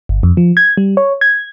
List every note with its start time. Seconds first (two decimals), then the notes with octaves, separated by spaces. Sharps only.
0.09 G1
0.23 F2
0.37 F3
0.57 G#6
0.77 G3
0.97 C#5
1.21 G#6